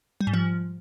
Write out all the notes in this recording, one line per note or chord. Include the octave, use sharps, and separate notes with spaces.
G3
G#2
F3